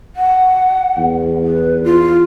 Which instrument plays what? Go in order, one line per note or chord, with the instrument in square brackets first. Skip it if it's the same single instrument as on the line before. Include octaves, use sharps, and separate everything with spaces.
[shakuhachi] F#5
[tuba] E2
[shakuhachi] B4
F4